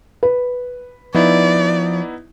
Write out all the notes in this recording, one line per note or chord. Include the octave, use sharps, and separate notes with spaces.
B4
F3 B3 D#4 E4 D5